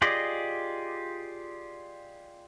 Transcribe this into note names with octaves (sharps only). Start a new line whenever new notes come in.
F4 G4 G#4 D5 D#5